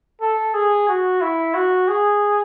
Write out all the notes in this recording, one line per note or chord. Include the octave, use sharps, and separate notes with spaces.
A4
G#4
F#4
E4
F#4
G#4